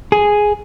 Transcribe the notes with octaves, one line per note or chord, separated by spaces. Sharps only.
G#4